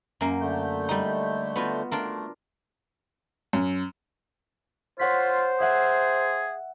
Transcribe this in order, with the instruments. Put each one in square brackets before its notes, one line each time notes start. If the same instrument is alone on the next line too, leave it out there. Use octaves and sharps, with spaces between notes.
[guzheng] F#2 A#3
[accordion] D3 A3 G6
[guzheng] G3 D#4
B3 F4 F#4
[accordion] A3 [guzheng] D4 F4 A#4
[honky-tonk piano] F#2
[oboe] F4 [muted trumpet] C5 [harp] C#5 F#5 B6
[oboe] G#4 [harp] E5 F#5